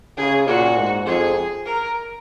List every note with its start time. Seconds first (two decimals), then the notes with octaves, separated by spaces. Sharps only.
0.17 C#3 G#4
0.46 A#2 F#4
0.77 G#2
1.06 F2 G#4
1.65 A#4